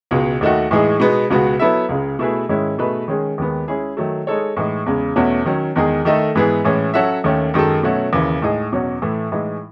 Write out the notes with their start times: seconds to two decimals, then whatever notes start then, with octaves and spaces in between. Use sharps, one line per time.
0.11 C#2 B2 G#3
0.41 D#2 D#3 A3 D#4 F#4
0.71 A2 E3 G#3 D#4 G#4
1.00 B2 G#3 B3 D#4
1.30 C#2 B2 G#3 B3 F#4
1.59 F#3 B3 E4 A4 E5
1.89 C#2 C#3 G#3
2.19 B2 A3 E4 G#4 B4
2.49 G#2 D#3 G#3 C#4 E4
2.78 B2 A3 D#4 G#4 B4
3.08 D#3 G#3 C#4 G#4
3.38 D#2 D#3 G#3 B3
3.68 G#3 C#4 E4 G#4
3.97 D#3 F#3 A3
4.27 G#3 D#4 A4 C#5
4.57 A2 E3 G#3 D#4
4.86 E2 C#3 G#3
5.16 E2 B2 A3 C#4 F#4
5.45 D#3 F#3 C#4
5.76 E2 D#3 G#3 D#4 G#4
6.05 D#3 A3 D#4 A4
6.35 G#2 E3 B3 E4 G#4
6.64 A2 E3 G#3 C#4
6.94 F#3 C#4 F#4 A4 E5
7.24 D#2 D#3 A3 C#4
7.54 F#2 D#3 G#3 D#4 A4
7.83 B2 F#3 A3 C#4 F#4
8.13 D#2 C#3 E3
8.42 A2 G#3 D#4 G#4 D#5
8.72 E2 B2 F#3 C#4 F#4
9.02 A2 E3 A3
9.32 A2 E3 G#3 D#4